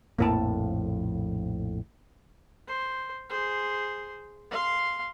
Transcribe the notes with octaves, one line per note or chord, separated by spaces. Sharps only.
A#1 F2 A2 A#3 E4 A5
C5
G#4 C5
F5 C6